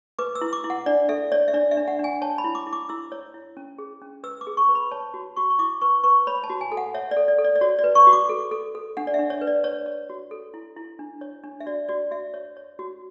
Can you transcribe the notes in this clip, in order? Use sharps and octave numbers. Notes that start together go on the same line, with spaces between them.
B4 D6
E6
E4
D6
E4
F#5
D4 D5
A4 E5
C#5 D5
E5
D4 D5
E5
D4
F#5
D4 G#5
C#5 A5
B5
E4
D6
E4
D6
E4 E6
C#5
E4
C#4
G#4
C#4
B4 E6
D6
G#4
C#6
B4
B5
C#5 A5
F#4
F#4 C#6
C#6
E4 D6
B4 C#6
B4 C#6
C#5 B5
A5
F#4
G#5
A4
F#5
C#5 E5
D5
A4
D5
A4
D5
D5
F#4 C#5
D5
B4
C#6
F#4
D6
A4
A4
A4
D4 F#5
D5
D4 E5
C#5
B4
D5
C#5
C#5
F#4
A4
E4
E4
D4
C#5
D4
E5
F#4 D5
F#4 D5
F#4 E5
C#5
C#5
F#4